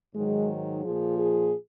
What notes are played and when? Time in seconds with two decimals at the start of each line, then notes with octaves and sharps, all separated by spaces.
0.14 G#2 D#3 F#3 G#3
0.83 A#2 F3 G#4
1.18 G#4